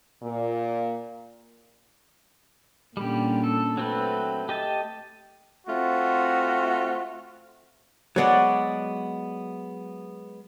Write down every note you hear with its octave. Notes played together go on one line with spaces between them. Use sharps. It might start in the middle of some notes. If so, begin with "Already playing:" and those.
A#2
A#2 D3 G3 C#4 G4
A4
F#3 A3 C4 B4
G4 D#5 A5
A3 C4 F4 F#4
F#3 G#3 B3 C#5 D5 F#5